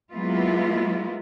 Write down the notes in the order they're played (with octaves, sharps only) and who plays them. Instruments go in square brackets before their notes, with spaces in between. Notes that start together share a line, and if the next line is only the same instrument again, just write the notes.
[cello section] F#3 G#3 A#3 B3 E4 F4